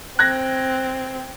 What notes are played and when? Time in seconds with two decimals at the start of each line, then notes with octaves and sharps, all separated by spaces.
0.19 C4 F#6 G#6 A#6